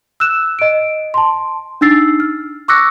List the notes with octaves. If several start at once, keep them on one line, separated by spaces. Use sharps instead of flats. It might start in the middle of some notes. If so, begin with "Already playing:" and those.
E6 F#6 E7
D#5 D7
A5 C6
D4 D#4 E6 A6 C7
F6
C#6 D6 E6 F#6 A#6 C#7